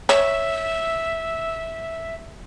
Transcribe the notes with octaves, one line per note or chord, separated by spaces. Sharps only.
C#5 E5